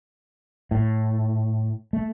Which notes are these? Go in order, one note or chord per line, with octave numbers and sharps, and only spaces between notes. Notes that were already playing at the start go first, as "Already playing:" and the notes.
A2
A3